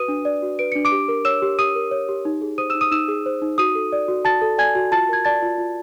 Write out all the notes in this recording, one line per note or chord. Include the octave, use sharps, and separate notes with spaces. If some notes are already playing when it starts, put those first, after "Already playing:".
Already playing: F#4 B4 D#6 D#7
D4
D5
F#4
B4 D7
D4 C#7
D6 D7
G4
A#4
C#5 E6 E7
G4
G4 D#6 D#7
A#4
C#5
G4
D#4
G#4
C5 D#6 D#7
D#4 E6 E7
D#6 D#7
D#4 E6 E7
G#4
C5
D#4
F#4 D#6 D#7
A4
D5
F#4
F#4 A5 A6
A4
D5 G#5 G#6
F#4
F4 A5 A6
A#4 G#6
D5 A5 A6
F4
F4